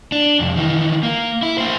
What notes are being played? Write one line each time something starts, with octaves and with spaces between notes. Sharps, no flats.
D4
C2 F2
D#3 E3
A#3
E4
A#3 C5